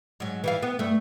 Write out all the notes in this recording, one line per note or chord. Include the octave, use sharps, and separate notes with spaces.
G#2 F#3
E3 G3 F5
B3
G2 A3